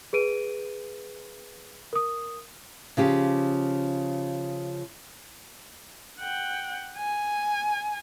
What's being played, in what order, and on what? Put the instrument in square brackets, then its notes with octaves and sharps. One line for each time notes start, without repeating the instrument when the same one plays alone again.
[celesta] G#4 B4 D7 D#7
A#4 D#6
[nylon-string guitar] C#3 F3 G4
[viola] F#5 G5
G#5